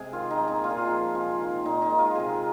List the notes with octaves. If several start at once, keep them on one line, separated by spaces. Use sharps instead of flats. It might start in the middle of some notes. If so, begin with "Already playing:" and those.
Already playing: C3 G#3 G#4
D#3 F4
D#4
A#3
D#4
A#2 F4
G#4
F4
F3 G#3
C3 F4
D#3 A#3
A#2 D#4
D#4
G#3
F4
C3 G#4